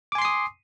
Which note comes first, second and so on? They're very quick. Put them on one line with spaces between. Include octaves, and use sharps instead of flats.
D6 G#5 C6 C7 D#6